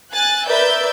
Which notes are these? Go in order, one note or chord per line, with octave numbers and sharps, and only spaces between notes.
G#5 F#6 A6
A#4 B4 D5 E5 E6 G6